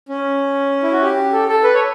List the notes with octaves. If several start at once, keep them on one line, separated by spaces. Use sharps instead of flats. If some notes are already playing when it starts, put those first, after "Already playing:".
C#4
E4
F#4
G4
A4
A4
B4
C#5